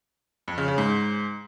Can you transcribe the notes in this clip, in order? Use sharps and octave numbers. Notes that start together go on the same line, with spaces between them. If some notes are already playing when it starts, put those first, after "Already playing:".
F2
C#3
C#3
G#2